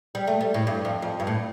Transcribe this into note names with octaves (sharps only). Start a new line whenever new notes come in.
G3
A3
G3
A2
G2
F2
F2
G2
A2